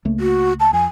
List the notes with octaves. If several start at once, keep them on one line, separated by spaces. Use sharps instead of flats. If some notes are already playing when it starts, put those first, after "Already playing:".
C#2 A3 A#3
F#4
A5
F2 G#5